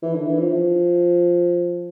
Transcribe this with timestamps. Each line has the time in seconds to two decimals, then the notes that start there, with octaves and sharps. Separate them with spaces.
0.02 E3
0.15 D3
0.27 E3
0.39 F3